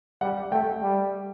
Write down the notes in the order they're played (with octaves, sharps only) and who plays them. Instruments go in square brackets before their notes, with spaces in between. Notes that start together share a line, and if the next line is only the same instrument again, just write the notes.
[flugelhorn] G3 [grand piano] F#5
[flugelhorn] A3 [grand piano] G5
[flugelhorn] G3